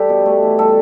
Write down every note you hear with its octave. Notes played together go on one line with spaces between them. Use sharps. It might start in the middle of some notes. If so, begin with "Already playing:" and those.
Already playing: G3 G4 A4 B4 D5
B2
A3
E3
G3 A4